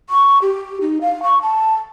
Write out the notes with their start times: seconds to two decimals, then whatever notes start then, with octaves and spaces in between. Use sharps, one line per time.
0.10 C#6
0.42 G4
0.81 D#4
1.01 F5
1.23 C#6
1.42 A5